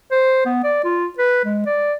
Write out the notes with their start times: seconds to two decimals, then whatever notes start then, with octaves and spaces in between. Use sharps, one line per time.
0.11 C5
0.46 B3
0.64 D5
0.85 F4
1.19 B4
1.45 G#3
1.66 D5